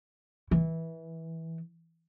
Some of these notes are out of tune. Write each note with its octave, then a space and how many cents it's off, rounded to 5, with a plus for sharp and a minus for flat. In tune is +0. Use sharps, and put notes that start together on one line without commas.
E3 -15